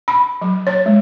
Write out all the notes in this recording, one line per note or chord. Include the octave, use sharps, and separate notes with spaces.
B5
F#3
C#5
G#3